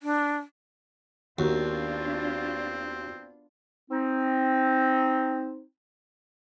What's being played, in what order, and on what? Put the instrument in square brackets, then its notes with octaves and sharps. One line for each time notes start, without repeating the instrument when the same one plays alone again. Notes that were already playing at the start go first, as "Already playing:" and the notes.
[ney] D4
[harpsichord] D#2 [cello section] B3 D4 F4 [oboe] C4 [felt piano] F#4 A#4
[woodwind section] C4 D#4